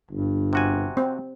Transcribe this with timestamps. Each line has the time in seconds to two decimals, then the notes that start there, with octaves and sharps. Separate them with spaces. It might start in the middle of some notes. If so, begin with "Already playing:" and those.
0.11 G1 G2
0.53 C3 F#4 G#5
0.97 C4